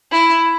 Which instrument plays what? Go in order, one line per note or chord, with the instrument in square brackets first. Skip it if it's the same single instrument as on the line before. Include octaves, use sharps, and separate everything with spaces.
[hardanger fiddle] E4